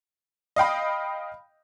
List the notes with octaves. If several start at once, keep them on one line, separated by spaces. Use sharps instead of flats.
D#5 F5 G5 B5